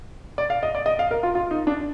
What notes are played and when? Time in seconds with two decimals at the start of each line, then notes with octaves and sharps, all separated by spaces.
0.38 D5
0.50 F5
0.63 D#5
0.75 D5
0.86 D#5
0.99 F5
1.11 A#4
1.23 F4
1.35 F4
1.51 D#4
1.67 D4